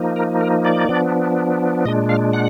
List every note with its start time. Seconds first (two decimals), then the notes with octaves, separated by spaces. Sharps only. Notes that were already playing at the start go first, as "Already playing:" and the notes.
Already playing: F3 A#3 D#4
0.16 A#4
0.41 A#4
0.65 D5
0.89 F3 B3 D4
1.85 A#2 G#3 D4 D#5
2.09 F5
2.33 F#5